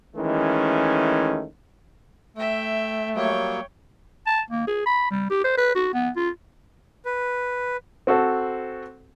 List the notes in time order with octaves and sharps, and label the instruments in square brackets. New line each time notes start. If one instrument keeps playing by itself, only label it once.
[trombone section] D#3 E3 G#3 A3 C#4
[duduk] A3 [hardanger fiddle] E5 G5
[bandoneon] F#3 G3 A#3 [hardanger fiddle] C#5 G5
[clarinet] A5
A#3
G#4
B5
G3
G4
C5
B4
F#4
B3
F4
[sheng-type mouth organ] B4
[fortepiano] C4 F#4 A4 C5